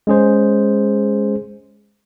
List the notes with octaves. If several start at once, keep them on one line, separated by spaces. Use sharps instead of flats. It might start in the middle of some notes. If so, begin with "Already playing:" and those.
G#3 C#4 G#4 C5